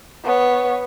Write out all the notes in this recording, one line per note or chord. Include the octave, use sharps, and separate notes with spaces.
B3 C#5